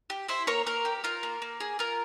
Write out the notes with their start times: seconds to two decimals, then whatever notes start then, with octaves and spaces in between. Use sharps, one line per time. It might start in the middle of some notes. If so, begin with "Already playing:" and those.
0.10 G4
0.28 E4 C5 E5
0.47 A#3 A#4 C#5
0.66 A#3 A#4
0.85 G4
1.04 F4 A#4
1.23 A#3
1.42 A#3
1.60 G#4
1.79 F4 A#4